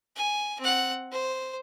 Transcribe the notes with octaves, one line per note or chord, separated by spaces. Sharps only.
G#5
C4 F#5
C5